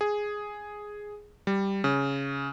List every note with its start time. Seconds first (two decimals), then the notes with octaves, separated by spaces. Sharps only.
0.01 G#4
1.47 G3
1.84 C#3